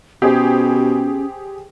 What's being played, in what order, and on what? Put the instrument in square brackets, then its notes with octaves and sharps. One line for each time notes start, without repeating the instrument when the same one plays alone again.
[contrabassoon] B2 [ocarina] C#4 [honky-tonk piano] G4 G#4 C5